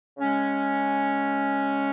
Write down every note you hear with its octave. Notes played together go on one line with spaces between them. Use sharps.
C#3 G#3 C#4